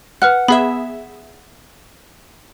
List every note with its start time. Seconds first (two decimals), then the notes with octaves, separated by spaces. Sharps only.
0.22 B4 F#5 F6 F#6
0.48 B3 G#4 E5 B5